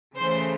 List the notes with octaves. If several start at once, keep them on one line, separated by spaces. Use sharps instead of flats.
C#3 E3 A3 C5